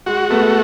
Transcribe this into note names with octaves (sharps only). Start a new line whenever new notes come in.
G#3 F#4
A3 B3